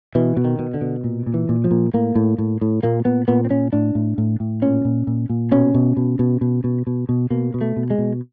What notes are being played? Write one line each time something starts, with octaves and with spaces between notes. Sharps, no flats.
B2 E3
B2
D#3
B2
D3
B2
A#2
A#2
E3
A#2
F3
A#2
A2 A#3
A2
A2
A2
A#2 A#3
A#2 B3
A#2 B3
C4
A#2 C#4
A2 D4
A2
A2
A2
A#2 C#4
A#2
A#2
A#2
B2 C#4
B2
B2
B2
B2
B2
B2
B2
B2 A#3
B2
A3
B2
G#3
B2